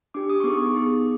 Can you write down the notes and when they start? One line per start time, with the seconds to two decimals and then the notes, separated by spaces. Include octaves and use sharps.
0.14 D4 G4 D6
0.30 D#6
0.40 C#6
0.44 B3 D#4 G#4 D6
0.74 B3 D#4 G#4